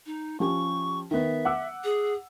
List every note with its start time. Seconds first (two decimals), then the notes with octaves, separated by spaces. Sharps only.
0.06 D#4
0.40 F3 C#4 G4 C#6
1.11 D#3 B3 E5
1.45 F#5 D6 E6
1.84 G#4